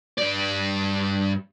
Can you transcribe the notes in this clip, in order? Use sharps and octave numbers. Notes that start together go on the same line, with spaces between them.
G2 D5